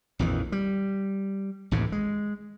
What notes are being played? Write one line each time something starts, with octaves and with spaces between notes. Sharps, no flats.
A#1 F2 D#3 E3
G3
A1 D#2 A2 C3
G#3